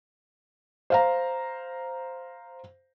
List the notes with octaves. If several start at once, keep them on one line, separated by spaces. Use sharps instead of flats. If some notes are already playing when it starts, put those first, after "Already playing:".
C5 F5 A#5